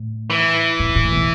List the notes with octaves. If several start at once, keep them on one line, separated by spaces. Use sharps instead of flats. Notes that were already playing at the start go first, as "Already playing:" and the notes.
Already playing: A2
E3
A2
A2
B2